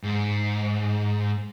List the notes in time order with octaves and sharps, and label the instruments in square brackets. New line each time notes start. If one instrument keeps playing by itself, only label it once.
[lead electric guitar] G#2